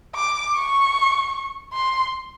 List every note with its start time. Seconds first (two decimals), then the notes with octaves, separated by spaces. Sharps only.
0.15 D6
0.55 C#6
1.73 C6